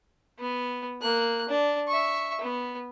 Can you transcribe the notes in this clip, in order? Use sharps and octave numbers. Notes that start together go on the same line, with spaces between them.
B3
A#3 F#6
D4
E5 C#6
B3